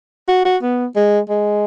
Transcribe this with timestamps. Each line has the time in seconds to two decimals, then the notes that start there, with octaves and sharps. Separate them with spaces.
0.28 F#4
0.45 F#4
0.62 B3
0.96 G#3
1.29 G#3